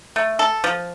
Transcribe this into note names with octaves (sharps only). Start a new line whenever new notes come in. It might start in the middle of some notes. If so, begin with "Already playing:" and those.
A3
A4
F3